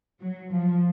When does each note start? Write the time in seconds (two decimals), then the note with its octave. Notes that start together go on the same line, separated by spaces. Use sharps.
0.20 F#3
0.51 F3